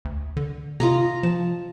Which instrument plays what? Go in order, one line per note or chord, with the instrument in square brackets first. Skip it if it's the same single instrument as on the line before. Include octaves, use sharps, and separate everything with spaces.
[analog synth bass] D2
D3
[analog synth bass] C3 [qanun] F4 D#5 A#5
[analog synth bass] F3 [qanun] A5